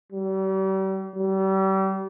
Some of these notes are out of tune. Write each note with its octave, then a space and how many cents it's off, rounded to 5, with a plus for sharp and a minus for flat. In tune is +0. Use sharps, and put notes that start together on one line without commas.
G3 -40
G3 -35